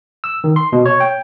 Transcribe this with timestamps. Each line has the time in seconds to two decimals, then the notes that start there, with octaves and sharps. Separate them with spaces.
0.24 E6
0.44 D#3
0.56 C6
0.73 B2
0.86 C#5
1.00 G5